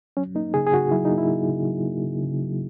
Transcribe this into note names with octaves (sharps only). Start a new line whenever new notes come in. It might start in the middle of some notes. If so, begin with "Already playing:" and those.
F#3 C#4
A#3 D#4
C#3 G#4
G#4
C#3 F#4
F#3 E4
D#4
A#3
E4
C#3
C#3
F#3
A#3
C#3
C#3
F#3